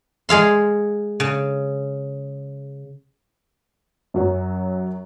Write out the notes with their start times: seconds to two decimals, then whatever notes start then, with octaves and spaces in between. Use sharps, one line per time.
0.29 G#3 G#4 F5 C6
1.20 C#3
4.14 F#2 F#3